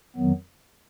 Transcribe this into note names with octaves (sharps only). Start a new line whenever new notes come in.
F2 D#3 F#3 B3